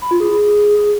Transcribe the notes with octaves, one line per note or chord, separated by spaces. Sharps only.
B5
F4
G#4